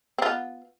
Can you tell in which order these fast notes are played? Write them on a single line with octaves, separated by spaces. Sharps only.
C4 F4 B3